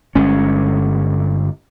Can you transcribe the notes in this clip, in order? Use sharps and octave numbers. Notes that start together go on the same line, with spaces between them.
G1 G#3 C#4